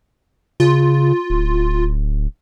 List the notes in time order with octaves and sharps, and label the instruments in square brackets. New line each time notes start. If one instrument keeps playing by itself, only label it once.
[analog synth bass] C#3 [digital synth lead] F4
[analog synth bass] D1